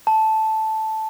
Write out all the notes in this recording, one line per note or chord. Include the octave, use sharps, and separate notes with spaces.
A5